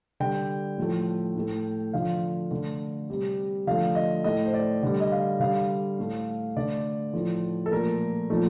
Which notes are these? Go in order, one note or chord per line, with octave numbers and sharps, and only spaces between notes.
D3 G3 G5
A2 F3 A3
A2 A3
D3 F3 A3 F5
D3 A3
C3 G3
D3 F3 A3 F5
D#5
A2 A3 D#5
C5
D5
D3 G3
D#5
F5
D3 G3 F5
A2 A3
D3 A3 D5
A2 F3 A3
A4
A#2 F3 A3 A#4
A#2 F3 A3